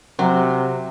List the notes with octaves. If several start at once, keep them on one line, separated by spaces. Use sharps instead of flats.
C3 F#3